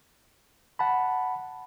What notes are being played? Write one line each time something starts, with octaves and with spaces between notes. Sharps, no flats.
F#5 A5 B5